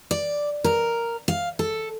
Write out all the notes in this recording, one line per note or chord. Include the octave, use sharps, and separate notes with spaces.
D5
A#4
F5
A4